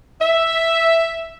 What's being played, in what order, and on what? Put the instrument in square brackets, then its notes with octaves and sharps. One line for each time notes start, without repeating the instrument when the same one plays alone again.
[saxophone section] E5